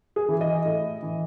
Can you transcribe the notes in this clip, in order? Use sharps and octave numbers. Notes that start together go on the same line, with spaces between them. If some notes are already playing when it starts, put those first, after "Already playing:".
G#4
E3
D#5
A2
E3